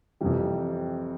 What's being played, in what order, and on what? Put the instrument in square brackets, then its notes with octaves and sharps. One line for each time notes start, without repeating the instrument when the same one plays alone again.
[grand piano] F2 C3 E3 G3